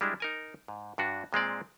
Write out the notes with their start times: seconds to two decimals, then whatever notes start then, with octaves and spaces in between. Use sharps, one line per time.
0.01 G3 G#3 D4 E4
0.20 D#4 A#4 G#5
0.68 G#2
0.98 G2 D4 F#4
1.33 A#2 G#3 C4 D5